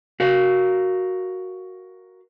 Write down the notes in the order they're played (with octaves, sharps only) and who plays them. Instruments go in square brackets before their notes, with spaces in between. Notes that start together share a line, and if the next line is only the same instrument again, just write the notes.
[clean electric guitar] F#4 A#4 F5